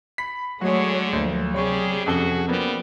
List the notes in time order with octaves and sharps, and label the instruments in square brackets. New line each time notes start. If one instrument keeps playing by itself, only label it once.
[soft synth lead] B5 [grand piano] B6
[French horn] D3 [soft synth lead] F#3 [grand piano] G#3 F#4 [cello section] A3 G#4 C#5
[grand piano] D2 [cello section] F3 A#3
[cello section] C3 G#4 [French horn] G3 [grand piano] C#5 C#6
[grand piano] F2 A4 G7 [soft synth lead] C#4 [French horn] F#4
[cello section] F3 [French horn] G3 [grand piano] A#3 B3